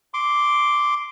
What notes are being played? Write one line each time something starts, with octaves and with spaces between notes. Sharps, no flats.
C6 D6